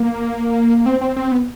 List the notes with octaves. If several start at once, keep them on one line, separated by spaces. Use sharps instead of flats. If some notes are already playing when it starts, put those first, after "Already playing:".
Already playing: A#3
C4
C4
C4
B3